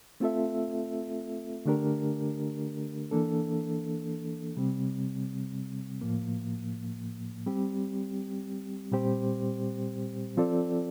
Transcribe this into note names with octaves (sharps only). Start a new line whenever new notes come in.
A3 C4 F4 A4 E5
D3 A3 D4 G4 A#4
E3 A#3 D4 A4
C3 G3 C4
A2 F3 A#3
G3 C4 G4
A#2 G3 C4 G4 C5
F3 C4 F4 A4 D5